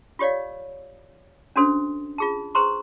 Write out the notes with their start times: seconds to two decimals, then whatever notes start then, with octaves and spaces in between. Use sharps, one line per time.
0.19 F4 G4 C#5 D5 F5
1.56 C#4 D4 F#4 A4 C5
2.18 F4 G#4 A5
2.55 G#4 B4 C5 A#5 C6 C#6